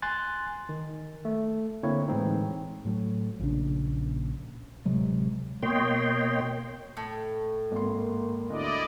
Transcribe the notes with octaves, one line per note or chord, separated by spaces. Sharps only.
G#5 C6 F#6 A6
D#3
A3
D3 A#3 C4 E4 C#5
A2 E3 G#3 C4 D#4
A2 F#3
A#1 A#2 C#3 D4
D1 C3 F#3 G#3
B2 A#3 C#5 D#5 G5 C6
A2
G#1 A#3 C6
D2 E4 D5 D#5